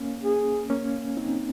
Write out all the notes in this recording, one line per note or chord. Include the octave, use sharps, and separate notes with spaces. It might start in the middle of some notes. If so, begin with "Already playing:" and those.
Already playing: A#3 C#4
G#4
A#3 C#4
C4 D#4